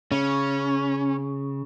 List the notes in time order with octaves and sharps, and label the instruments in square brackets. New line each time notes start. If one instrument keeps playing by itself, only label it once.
[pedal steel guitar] C#3 [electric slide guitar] C#4